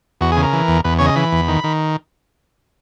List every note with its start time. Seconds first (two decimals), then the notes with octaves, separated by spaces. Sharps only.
0.21 E2 F#4
0.32 G#4
0.37 C#3
0.43 A#4
0.53 E3
0.68 E2
0.84 E2 B4
0.99 C#3 C#5
1.06 D#5
1.16 E3 B5
1.32 E2
1.48 D#3
1.64 D#3